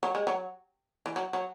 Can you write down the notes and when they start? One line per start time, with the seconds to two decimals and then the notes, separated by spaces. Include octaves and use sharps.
0.03 F#3
0.15 G#3
0.27 F#3
1.06 E3
1.16 F#3
1.33 F#3